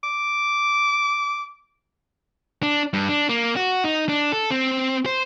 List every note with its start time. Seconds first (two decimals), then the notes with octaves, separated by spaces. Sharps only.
0.04 D6
2.63 D4
2.93 G2
3.09 D4
3.29 A#3
3.56 F#4
3.84 D#4
4.09 D4
4.32 A4
4.51 C4
5.06 C5